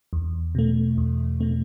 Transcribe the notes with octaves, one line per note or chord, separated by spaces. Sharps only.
E2
B2 A3
E2
B2 A3